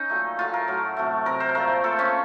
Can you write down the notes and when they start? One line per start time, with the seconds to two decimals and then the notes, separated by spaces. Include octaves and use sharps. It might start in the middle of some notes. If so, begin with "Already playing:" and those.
Already playing: C#4 D#4
0.10 A#2 F#3 A3
0.39 A2 F#3 A3 F4
0.54 A#4
0.68 A2 F#3 A3
0.97 C3 F#3 A3
1.26 C3 F#3 A3 A#4
1.40 C5
1.55 A#2 F3 A3 A#4
1.84 A#2 F3 A3 A4
1.99 C#4